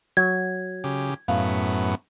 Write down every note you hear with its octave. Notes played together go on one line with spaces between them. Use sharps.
F#3 G#6
C#3 G4
F#2 A2 B3 F5